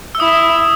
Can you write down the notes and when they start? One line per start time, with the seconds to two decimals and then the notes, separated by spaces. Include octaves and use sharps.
0.15 E6
0.20 E4 D#6